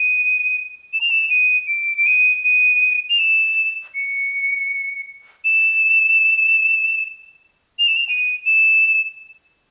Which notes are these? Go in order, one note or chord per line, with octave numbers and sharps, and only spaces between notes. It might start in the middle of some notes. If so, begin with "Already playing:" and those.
Already playing: D#7
E7
F7
E7
D#7
D7
D7
D#7
D#7
F7
E7
C#7
E7
F7
E7
F7
D#7
E7